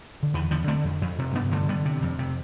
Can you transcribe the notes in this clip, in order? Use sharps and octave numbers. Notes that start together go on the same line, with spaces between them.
D3
E2 E3
E2 D3 F3
D3 A3 C4
F2
F2
C3
G2 B3 D4
D3 F3 A3
D3 G3 B3
C3
F2
C3